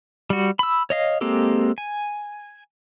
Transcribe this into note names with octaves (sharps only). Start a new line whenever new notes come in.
G3 F#4
B5 E6
C#5 D#5 F5
G#3 A#3 C4 G4 A4
G#5